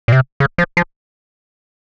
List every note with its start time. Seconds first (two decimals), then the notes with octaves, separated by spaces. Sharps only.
0.08 A#2
0.12 C3
0.40 C#3
0.58 F3
0.77 F3